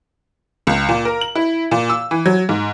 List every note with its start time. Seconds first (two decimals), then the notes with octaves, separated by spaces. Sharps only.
0.67 C#2
0.89 A#2
1.05 A#4
1.21 F#7
1.35 E4
1.71 A#2
1.90 E6
2.11 E3
2.26 F#3
2.49 G#2